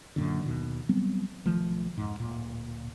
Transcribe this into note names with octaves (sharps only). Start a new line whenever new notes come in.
F#2 A#2 D3
D#2 B2 D#3
F#3 G3 B3 C4
B1 D#3 F3 A3
F2 G#2
D1 A#2